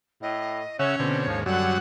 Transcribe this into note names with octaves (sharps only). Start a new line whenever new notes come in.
A2 D#5
C#3 C#4 C#5 E5 F#5
B2 D3 C4
D#2 G#2 F3
F#2 D3 F#3 G3 F#5